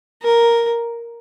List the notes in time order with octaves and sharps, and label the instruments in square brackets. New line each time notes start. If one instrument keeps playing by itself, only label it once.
[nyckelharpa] A#4